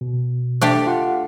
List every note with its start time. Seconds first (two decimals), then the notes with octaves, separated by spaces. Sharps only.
0.01 B2
0.61 A3 D4 G4
0.86 F4 F#5